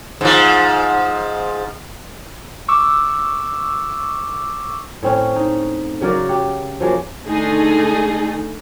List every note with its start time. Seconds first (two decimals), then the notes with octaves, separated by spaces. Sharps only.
0.21 G#2 F3
2.68 C#6 D6 E6
5.03 A2 C4 C#4
5.36 D#4
6.01 C#3 F#3 A#4 D5
6.29 G4 F#5
6.80 F3 F#3 G#3 A#3
7.25 D3 G#3 A3 D#4 G#4 A4